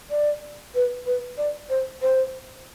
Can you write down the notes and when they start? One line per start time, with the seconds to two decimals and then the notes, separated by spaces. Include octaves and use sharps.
0.10 D5
0.75 B4
1.06 B4
1.37 D5
1.70 C5
2.02 C5